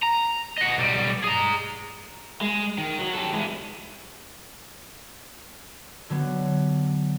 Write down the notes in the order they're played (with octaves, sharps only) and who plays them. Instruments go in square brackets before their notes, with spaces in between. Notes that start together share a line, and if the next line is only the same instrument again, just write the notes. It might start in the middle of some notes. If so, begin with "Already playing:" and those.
[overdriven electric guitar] A#5
D#5 F#5
B1 G3
G#4 A#5
G#3
D#3
F#3
G4 A4
E3 G#3
[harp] D3 F#3 B3